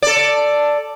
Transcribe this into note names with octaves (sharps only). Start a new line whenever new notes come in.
A4 D5